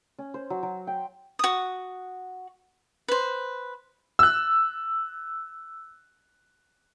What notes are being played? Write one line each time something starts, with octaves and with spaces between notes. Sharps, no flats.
C#4
C5
F#3
F#3
G5
F#4 D#6
B4 C5
E6 F#6